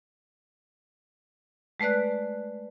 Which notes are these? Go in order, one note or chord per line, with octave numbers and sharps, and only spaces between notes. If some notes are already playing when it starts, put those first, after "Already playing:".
G#3 A3 B4 D5 F#6